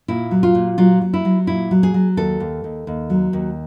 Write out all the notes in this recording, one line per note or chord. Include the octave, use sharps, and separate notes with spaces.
A#2 E4
F#3
F4
A#2
F#3 F4
F#3
E4
F#3
A#2 E4
F#3
G#4
F#3
D#2 A4
D#2
D#2
D#2
F#3
D#2